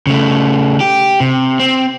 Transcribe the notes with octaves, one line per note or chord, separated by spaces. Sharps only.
C#3 A3
G4
C3
C4